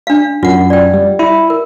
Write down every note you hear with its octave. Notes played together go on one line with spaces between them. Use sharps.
D4 F5
F#2 F4 F#5
D5 G5
G3
E4
A#4